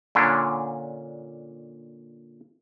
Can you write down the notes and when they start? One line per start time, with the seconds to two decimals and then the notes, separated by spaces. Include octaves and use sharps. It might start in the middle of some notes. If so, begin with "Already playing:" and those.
0.15 A#2 D3 C#4 D4